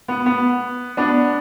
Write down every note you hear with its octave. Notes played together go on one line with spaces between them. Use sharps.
B3
B3
B3 D4